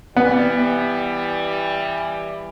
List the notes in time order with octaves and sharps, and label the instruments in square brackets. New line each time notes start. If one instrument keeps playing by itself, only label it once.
[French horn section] E3 G3 [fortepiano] B3